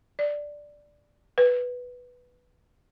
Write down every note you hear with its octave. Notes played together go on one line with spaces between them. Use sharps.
D5
B4